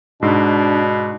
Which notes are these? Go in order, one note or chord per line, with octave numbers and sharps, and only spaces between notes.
G#2 B2 D4 E6 C7